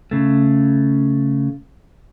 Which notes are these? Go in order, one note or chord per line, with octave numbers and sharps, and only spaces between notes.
C#3 A3